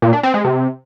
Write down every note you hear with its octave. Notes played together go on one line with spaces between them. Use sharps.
A#2
D4
C4
G#3
C3